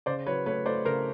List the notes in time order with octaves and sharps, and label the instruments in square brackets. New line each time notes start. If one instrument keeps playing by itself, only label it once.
[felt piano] C#3 C5 D5
F#3 B4 C#5
A3 B4 C#5
A3 C5 D5
C#3 A#4 C5